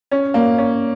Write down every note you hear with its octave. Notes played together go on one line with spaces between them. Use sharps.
C#4
A#3
C#4